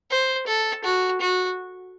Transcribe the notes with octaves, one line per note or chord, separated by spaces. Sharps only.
C5
A4
F#4
F#4